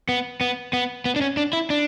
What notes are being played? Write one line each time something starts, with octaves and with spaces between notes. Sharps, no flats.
B3
B3
B3
B3
D4
C#4
D4
E4
D4